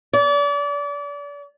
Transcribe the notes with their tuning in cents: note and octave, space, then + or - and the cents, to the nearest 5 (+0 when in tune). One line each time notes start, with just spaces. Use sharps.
D5 -35